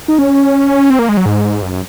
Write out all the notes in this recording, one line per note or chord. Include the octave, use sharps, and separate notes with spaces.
D#4
C#4
C4
A#3
G#3
F#3
G#2
F#2